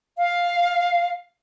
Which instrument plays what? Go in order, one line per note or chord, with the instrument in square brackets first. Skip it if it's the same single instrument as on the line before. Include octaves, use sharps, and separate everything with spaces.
[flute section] F5